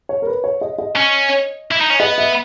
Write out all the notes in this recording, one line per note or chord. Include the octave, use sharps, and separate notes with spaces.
C#5
A#4
B4
C#5
D#5
D#5
C#4
E4
D#4
C#4
B3 D#5
E5